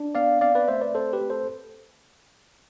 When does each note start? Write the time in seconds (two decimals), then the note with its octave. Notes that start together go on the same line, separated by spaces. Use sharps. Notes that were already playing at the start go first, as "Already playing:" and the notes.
Already playing: D4
0.15 B3 D5 F5
0.41 C4 D5 F5
0.55 B4 D5
0.68 A3 C5 E5
0.81 B4 D5
0.94 C4 A4 C5
1.13 G4 B4
1.21 A3
1.30 A4 C5